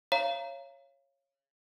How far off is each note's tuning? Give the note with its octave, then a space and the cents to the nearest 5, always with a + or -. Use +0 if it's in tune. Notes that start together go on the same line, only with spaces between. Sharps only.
C#5 -10 F5 -30 A#5 +0